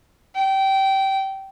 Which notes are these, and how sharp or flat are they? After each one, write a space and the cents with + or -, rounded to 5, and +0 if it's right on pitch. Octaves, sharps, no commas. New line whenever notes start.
G5 -20